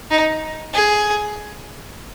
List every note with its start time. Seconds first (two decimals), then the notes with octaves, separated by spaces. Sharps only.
0.11 D#4
0.74 G#4